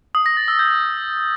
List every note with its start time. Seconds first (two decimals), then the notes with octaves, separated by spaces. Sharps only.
0.15 D#6
0.26 A#6
0.37 A6
0.48 E6
0.59 G6